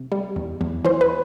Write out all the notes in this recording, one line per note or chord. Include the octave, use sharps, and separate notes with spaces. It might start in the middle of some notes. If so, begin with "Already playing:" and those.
Already playing: C3
G3
E2
E2
E3 C5
B4